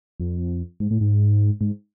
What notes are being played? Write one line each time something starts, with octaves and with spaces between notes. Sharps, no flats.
F2
G#2
A2
G#2
G#2